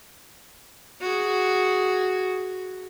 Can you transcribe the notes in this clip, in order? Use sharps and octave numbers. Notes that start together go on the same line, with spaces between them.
F#4 G#4